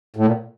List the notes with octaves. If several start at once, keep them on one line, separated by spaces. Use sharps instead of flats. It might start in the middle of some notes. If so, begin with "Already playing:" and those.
A2
A#2